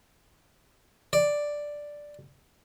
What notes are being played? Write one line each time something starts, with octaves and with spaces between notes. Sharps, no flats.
D5